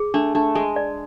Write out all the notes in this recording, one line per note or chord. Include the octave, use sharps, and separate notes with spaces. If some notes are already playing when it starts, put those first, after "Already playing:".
Already playing: G#4
A3 D4
A3 D4
G#3 G#5
D5